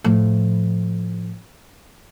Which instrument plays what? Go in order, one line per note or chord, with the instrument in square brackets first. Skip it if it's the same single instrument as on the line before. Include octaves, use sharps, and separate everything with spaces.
[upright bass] A2 F3